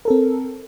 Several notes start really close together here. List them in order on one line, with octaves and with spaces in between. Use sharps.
A#4 A4 C4